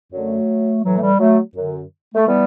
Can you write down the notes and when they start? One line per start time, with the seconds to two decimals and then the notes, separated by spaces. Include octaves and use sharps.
0.12 F#2 D3 F#3 A3
0.83 A2 E3 F#3
0.97 A3
1.02 G3
1.19 F#3 A3
1.55 F#2 D3
2.15 A3
2.27 E3 G3 B3